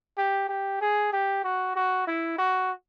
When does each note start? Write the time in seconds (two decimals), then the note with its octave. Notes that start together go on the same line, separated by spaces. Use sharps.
0.17 G4
0.49 G4
0.81 G#4
1.12 G4
1.44 F#4
1.76 F#4
2.07 E4
2.38 F#4